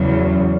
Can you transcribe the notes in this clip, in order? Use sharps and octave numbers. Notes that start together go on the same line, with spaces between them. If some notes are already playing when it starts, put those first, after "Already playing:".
Already playing: E2 C#3 F#3